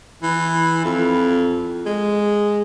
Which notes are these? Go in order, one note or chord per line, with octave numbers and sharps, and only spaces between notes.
E3
F2
G#3